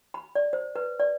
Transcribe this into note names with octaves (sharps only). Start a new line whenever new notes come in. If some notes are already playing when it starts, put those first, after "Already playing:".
B5
D5
C5
B4
D5